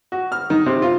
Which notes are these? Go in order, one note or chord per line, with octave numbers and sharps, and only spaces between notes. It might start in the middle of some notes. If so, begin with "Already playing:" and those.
F#4
F6
D#3
C3
F4